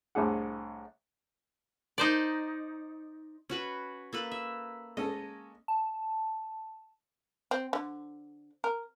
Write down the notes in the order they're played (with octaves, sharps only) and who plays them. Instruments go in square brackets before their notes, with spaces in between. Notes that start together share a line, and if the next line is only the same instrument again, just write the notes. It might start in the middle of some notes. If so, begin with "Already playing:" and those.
[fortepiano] C2 A2 D4 G#4 F#5
[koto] D#4 C5 D5
[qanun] C#4 F#4 B4
A#3 A4 B4
E5
[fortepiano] G#3 C#4 A4 [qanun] D#5
[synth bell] A5
[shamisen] C4
D3
A#4